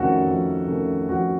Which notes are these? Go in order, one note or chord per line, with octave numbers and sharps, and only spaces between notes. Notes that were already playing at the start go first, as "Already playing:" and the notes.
Already playing: F2 C3 D#3 A3 C#4 F#4 A4
F2
C3 D#3 A3 C#4
F2 F#4